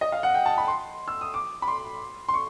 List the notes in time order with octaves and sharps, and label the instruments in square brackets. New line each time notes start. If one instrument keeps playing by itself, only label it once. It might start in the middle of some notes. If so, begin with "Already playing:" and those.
[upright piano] D#5
F5
F#5
G5
A5
B5
C6
E6
D#6
D6
B5
C6
C6
C#6